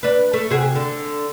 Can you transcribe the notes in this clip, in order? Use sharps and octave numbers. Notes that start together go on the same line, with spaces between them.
D4 B4
A3
C3 F#4 G#4
D3